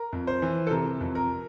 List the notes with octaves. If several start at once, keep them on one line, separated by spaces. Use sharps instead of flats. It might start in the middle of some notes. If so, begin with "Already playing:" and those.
Already playing: A#4
F2
C5
E3
A4
C3 A#4
F2
A#4